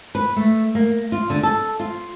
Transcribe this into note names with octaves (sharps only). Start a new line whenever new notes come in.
B4
A3
A#3
F4
D3
A4
F4